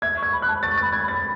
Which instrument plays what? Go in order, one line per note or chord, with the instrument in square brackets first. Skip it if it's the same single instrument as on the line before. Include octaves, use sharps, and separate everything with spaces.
[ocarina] E5 [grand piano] G#6
[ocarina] C#6
[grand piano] G#6
[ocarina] B5
[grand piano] F#6
[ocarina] A5
[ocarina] C#6 [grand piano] A6
[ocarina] B5 [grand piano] A6
[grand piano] G#6
[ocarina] B5
[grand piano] A6